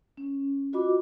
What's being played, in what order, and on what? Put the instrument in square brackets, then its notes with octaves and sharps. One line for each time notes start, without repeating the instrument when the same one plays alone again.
[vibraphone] C#4
F4 F#4 D#5 B5 D6